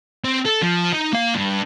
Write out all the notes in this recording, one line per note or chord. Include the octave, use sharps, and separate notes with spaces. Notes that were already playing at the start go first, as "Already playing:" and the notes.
C4
A4
F3
D#4
A#3 F5
G2